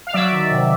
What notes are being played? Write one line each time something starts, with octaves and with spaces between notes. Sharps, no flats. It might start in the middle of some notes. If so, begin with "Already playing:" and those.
F5
F#3 D5 E5
D#3
C3